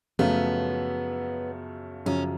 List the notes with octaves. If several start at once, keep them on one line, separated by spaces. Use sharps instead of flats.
F#2 C#3 F3 A3 B3 F4
F#2 C#3 F3 C#4